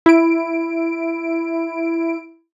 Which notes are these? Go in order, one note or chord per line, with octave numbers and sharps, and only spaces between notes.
E4 D7